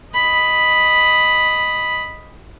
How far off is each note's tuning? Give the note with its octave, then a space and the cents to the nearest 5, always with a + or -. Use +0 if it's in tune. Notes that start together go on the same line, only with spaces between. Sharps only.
D#5 +0 B5 +0